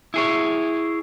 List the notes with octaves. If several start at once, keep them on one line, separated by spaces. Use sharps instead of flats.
E4 G#4 C#5